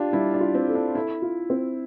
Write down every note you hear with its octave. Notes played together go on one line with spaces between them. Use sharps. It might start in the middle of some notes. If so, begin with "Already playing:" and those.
Already playing: D4 F4 G4
G3 E4
D4
F4
C4
A4
D4
E4 A4
F4
C4